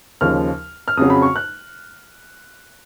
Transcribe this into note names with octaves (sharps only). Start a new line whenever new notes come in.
D#2 C#3 F3 F6
F6
F2 C#3 F#3 D#6
B5
C#6
F#6